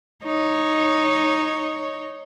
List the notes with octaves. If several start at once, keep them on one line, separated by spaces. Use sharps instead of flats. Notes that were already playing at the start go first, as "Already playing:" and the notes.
D#4 C#5